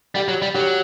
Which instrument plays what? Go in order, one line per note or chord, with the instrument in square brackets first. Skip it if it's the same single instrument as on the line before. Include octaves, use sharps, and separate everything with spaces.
[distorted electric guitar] G3 [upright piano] G4
[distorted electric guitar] F#3
G3
[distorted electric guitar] F#3 [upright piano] G4